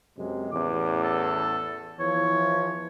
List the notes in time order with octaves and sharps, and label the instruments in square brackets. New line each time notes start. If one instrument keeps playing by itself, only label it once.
[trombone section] F#2 C3 G#3
[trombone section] A1 E2 [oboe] D6
[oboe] A4
[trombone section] E2 E3 F3 [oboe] C#5